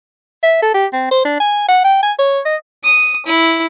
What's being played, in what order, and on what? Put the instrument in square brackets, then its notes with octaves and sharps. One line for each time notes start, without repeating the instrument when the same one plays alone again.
[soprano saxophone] E5
A4
G4
C4
C5
D4
G#5
F#5
G5
G#5
C#5
D#5
[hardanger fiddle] D#6
E4